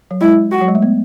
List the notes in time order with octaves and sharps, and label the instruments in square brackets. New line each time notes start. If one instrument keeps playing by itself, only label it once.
[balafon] F#3
[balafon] G#3 [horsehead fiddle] E4
[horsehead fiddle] F#4
[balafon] F#3
G#3
A3
B3